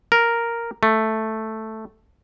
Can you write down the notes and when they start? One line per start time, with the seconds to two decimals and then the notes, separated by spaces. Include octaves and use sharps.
0.12 A#4
0.83 A3